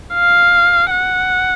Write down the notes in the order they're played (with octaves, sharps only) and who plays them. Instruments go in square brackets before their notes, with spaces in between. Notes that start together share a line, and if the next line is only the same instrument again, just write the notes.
[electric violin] F5
F#5